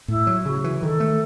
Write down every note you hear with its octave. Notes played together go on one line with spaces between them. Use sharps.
A2 E4
F#3
C#3 F#4
E3
D#3 A4
A3